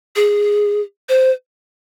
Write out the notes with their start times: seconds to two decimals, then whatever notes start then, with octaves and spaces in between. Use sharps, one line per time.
0.16 G#4
1.09 C5